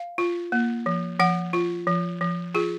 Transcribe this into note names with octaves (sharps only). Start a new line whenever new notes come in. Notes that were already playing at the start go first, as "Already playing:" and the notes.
Already playing: F5
F4
A#3
F3
F3 F#5
F4
F3
F3
F4 G#4